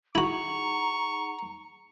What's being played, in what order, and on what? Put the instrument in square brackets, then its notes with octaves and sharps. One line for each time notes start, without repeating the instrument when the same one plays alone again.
[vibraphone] D#4 G#4 F#5 [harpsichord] E4 F#4 [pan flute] A#5 [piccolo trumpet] C#6